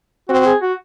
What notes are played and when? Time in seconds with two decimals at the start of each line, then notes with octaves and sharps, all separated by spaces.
0.29 C4 F#4
0.46 G#4
0.62 F#4